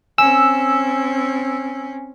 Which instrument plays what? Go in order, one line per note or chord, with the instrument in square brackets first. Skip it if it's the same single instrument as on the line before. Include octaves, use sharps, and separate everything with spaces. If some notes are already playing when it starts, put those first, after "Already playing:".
[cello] C4 C#4 [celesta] G#5 [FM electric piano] E6